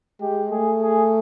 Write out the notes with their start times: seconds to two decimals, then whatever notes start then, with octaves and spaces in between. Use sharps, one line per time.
0.21 G#3 G4
0.51 A3 G#4
0.82 G#4